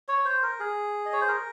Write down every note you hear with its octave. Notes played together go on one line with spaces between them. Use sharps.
C#5
C5
A#4
G#4
D#5
C#5
C5
A#4